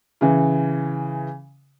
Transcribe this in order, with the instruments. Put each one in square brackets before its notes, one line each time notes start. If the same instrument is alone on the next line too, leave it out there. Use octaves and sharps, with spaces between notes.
[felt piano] C#3 E3